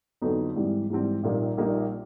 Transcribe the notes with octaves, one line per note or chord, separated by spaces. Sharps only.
F2 D3 F#3 B3 D#4
G#2 E3 G3 C4
G#2 E3 G3 C4
A#1 A#2 G3 A#3 D#4
A#1 A#2 G3 A#3 D#4